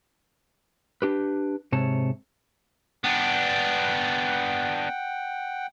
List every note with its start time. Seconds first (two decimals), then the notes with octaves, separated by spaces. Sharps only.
1.02 D4 G4 B4
1.72 G#2 C3 C#5 A5
3.04 B3 D4 F#5 G5